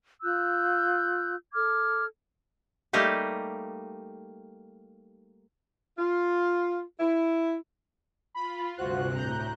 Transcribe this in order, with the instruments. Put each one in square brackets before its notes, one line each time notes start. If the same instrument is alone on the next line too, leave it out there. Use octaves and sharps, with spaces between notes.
[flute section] F4 E6 F#6 G6
A4 D6 F6 G#6
[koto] G3 A3 A#3 D#4 G4
[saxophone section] F4
E4
[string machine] F4 [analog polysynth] B5
[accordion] D2 F#6 [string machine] G2 C3 [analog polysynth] F4 F#4 C5
[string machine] A2 [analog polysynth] A#5 G6